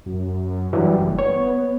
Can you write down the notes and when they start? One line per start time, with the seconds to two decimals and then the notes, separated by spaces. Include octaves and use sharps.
0.06 F#2
0.73 G2 E3 F#3 G3
1.02 F#1
1.19 B3 C#5